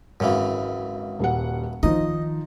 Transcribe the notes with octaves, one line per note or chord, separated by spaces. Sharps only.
G#1 F#2 C#3 E3
D#1 G3 F#5
D#3 F3 D#4 D#5